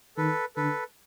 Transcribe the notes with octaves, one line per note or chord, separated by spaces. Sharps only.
D#3 A4 B4
D3 A4 B4